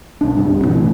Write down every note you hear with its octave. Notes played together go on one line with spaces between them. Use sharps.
B1 D4
G2 C3
G1 C2 C3
E2 B2 D#3 E3
A#1 A2 D#3 E3